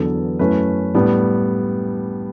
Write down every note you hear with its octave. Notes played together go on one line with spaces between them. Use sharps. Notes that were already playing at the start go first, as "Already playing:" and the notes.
Already playing: E2 D3 F#3 B3 D4 A4
F#2 E3 A3 C#4 B4
A2 G3 B3 D4